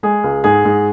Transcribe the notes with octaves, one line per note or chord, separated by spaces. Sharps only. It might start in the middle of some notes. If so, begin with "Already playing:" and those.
G#3 G#4
C#2
G#2 G#4
G#2